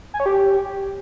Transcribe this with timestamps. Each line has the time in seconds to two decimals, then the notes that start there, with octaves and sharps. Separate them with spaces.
0.14 G#5
0.20 C#5
0.26 G4